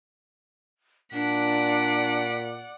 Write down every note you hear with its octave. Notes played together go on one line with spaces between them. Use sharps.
A#2 D4 D5 F#5 B6 D7